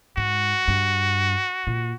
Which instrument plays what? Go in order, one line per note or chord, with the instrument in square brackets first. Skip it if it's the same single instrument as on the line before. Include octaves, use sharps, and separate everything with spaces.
[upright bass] G#2 [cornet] F#4
[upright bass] G2
A#2